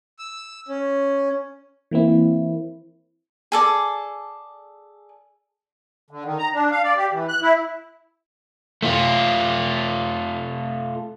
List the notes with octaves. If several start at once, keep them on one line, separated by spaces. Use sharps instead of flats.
E6
C#4
E3 A#3 C4 E4
G#4 A4 D5
D3
D#3
A#5
D4
F5
D5
G4
E3
F#6
E4
A3 F4